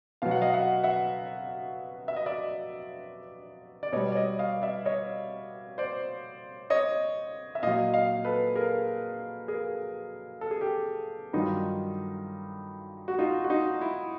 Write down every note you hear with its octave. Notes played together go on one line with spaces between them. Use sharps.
B2 F#3 F5
F#5
D#5 F5
E5 F#5
E5 F#5
E5
D#5
D5 E5
D5
B2 G3 C#5 D#5
D5
C#5 D#5
D#5 F5
D5 E5
C#5 D#5
C5 D5
C#5 D#5
E5
A#2 F#3 D#5 F5
D#5 F5
A4 B4
G#4 A#4
G#4 A#4
A4
G#4
G4 A4
G2 D#3 F#3 D#4 F4
F#4
D#4 F4
F#4
D#4 F4
E4